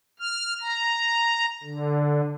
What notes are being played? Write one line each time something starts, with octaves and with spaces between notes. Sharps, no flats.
F6
A#5
D3